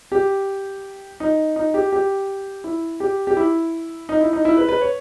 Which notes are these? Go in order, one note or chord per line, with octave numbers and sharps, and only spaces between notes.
G4
D#4
D#4
G4
G4
E4
G4
G4
E4
D#4
E4
D#4
E4
B4
B4
C#5